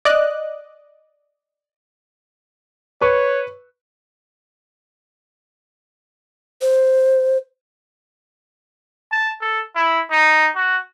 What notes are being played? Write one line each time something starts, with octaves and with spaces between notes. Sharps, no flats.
D5 D#5 F#6
B4 C#5 C#6
C5
A5
A4
E4
D#4
F#4